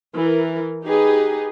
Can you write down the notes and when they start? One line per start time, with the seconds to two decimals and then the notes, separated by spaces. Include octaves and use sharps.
0.13 E3 A#4
0.84 D#4 G4 G#4 B4